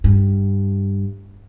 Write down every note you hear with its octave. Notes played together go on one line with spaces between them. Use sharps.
G2